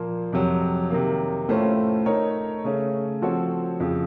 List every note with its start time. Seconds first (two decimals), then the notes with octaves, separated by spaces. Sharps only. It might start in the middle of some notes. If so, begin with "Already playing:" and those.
Already playing: A#2 F3 A#3 F4
0.33 F2 C3 F#3
0.90 C3 D#3 A#3
1.48 A2 A3 C#4 F4 C5
2.06 A3 D#4 A#4 C#5
2.64 C#3 A3 C#4
3.22 F3 C4 F#4 A4 C#5
3.80 F2 C#3 F3